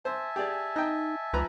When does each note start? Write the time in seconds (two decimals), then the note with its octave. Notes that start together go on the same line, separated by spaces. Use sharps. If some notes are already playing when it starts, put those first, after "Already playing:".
0.05 C5 E5 G#5 A5
0.36 G4 G#4 D5
0.76 D#4 D#5 G5
1.33 C#2 F3 B4 A#5